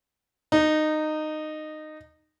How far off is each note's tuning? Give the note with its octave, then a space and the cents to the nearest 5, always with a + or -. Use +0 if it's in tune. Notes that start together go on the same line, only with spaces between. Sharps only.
D#4 -15